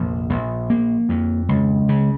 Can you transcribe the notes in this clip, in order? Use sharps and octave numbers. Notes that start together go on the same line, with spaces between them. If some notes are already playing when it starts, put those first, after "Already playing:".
Already playing: F1 A#1
A#1
A#3
F2
C#2
C#3